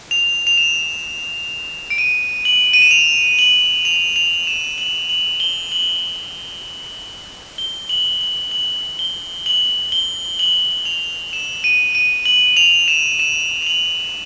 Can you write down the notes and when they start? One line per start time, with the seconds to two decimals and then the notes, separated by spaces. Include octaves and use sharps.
0.11 F7
0.47 F7
0.57 E7
1.90 D7
1.98 D#7
2.45 F#7
2.73 D#7
2.82 E7
2.91 F7
3.39 F#7
3.85 F7
4.16 F7
4.47 E7
4.78 F#7
5.09 F#7
5.40 G7
5.72 F#7
7.58 G7
7.89 F#7
8.21 F#7
8.51 F#7
8.99 G7
9.46 F#7
9.92 G7
10.39 F#7
10.85 F7
11.33 E7
11.64 D#7
11.95 D#7
12.25 F#7
12.57 F7
12.88 E7
13.20 E7
13.62 F7
13.67 F#7